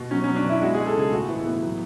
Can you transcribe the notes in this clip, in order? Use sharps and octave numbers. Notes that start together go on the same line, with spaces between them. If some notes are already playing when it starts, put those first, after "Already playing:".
Already playing: B2
F#3 C#4
C#4
F#3
D4
B2
E4
G#3 F#4
G#4
G#3
A4
C#3 G#4
A2 F#4
E3 B3
A2 B3
F#3